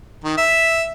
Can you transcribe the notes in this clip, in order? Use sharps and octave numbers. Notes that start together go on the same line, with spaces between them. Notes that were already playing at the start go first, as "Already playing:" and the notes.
D#3
E5